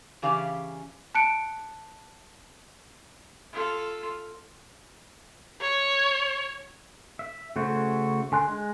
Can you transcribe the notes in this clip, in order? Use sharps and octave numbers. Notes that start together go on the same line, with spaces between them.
C#3 E3 C#4 G4 D5 F5
A5 F#6 C#7 D7
F4 A4
C#5
E5
C#3 A3 F#4 C5 C#5
D3 G#5 C6 F#6
G#3